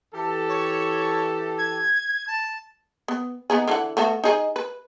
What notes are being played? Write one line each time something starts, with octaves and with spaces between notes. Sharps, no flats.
E3 G4 A4
C#5
G#6
A5
B3
B3 D#4 G#4
D3 E3 F#5
A3 B3 F#4
D#4 G#4 D#5
B4